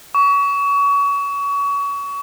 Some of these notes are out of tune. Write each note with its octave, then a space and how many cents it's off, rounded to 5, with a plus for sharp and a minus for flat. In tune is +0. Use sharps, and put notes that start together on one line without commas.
C#6 +30